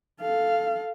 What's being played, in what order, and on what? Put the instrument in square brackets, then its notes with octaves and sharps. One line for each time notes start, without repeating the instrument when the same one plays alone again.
[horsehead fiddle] A4 F5